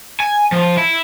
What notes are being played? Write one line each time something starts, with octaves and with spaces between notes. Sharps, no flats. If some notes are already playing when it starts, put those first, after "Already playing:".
G#5
F3
E4